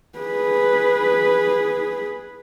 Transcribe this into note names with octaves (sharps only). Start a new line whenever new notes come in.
G#4 B4